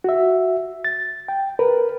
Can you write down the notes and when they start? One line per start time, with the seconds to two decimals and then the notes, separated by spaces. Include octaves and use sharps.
0.04 F#4 E5
0.85 A6
1.28 G5
1.59 A#4 B4